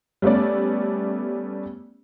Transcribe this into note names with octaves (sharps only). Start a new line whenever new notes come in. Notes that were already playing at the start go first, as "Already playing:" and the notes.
G3 A3 B3 C#4 D5